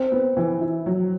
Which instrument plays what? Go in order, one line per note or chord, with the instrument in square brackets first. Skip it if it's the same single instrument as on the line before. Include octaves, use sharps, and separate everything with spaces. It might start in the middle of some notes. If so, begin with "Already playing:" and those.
Already playing: [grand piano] C4
[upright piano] B3
E3
E4
F#3